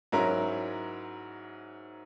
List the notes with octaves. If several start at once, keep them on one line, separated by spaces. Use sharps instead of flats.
G#2 F#3 C#4 E4 A#4